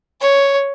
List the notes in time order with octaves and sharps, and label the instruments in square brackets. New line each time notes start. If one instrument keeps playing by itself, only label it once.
[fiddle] C#5